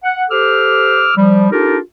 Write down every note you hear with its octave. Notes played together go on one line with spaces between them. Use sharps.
F#5
G4 A4 C5 D6 E6 F6
F3 G3
D4 D#4 F4 G4 A4 A#4